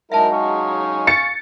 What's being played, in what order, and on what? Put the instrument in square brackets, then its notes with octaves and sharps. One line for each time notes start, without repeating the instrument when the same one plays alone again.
[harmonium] F#3 G#3 D#4 [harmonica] E4 A#4 [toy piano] E5 A5
[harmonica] F5 G#5 C#6
[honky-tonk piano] A6 C#7